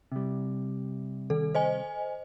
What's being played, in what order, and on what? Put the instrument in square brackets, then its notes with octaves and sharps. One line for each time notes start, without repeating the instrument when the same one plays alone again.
[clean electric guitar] C3 G3
[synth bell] D#3 A4
C5 D#5 G#5